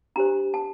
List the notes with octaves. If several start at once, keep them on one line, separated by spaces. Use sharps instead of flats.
D4 G4 C5 A#5
A5